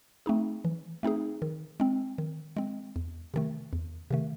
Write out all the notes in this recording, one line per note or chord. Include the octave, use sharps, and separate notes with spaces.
A3 C4 D#4 G#4
E3
A3 C4 D#4 G#4
D#3
G#3 C4
D#3
G#3 C4
E2
C3 D#3 A3
E2
C3 D#3 A3